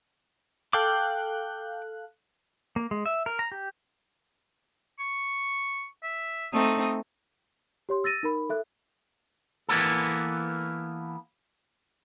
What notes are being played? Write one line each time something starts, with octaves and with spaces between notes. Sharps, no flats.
A4 F5 G5 D6 F#6
A#3
G#3
E5
A#4
A#5
G4
C#6
E5
A3 C4 D#4 D#6
G4 C#5 C6
E6 A6 A#6 D#7
D#4 A#4 B5
A4 E5 F#6
E3 A#3 B3 A4